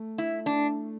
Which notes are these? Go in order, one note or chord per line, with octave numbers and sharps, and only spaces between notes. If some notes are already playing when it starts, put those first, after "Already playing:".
Already playing: A3
E4
A3
D4